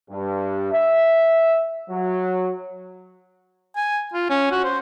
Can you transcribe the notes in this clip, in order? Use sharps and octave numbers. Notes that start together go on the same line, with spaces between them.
G2
E5
F#3
G#5
F4
C#4
F#4
C5